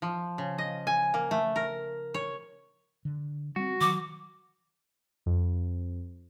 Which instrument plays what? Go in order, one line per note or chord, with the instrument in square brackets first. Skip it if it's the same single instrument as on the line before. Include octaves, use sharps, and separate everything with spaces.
[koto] F3
C#3
D#5
G#5
A#3
A3
A#4
C#5
[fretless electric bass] D3
[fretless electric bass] G3 C4 [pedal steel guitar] F#4
[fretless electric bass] D#3 F#3 [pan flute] D6
[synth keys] F2